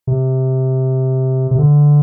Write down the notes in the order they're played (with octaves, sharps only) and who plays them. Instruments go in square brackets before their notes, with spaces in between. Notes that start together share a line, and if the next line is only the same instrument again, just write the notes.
[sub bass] C3
C3
D3